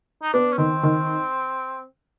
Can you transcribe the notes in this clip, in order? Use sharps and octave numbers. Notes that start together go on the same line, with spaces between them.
D#4
B3 D4
C#4
D#3 C4
D#3